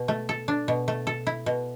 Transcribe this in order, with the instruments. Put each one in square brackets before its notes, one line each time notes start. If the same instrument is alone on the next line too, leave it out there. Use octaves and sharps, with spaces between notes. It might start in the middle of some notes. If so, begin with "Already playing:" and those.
Already playing: [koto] B2
A3
A4
D4
B2
A3
A4
E4
B2